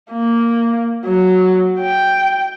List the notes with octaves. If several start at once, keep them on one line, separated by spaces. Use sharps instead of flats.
A#3
F#3
G5